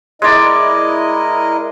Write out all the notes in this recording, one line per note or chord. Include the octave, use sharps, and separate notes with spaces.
G#3 E4 A#4 D5 D#5